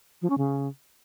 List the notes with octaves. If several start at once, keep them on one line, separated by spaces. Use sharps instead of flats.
F3
C#4
C#3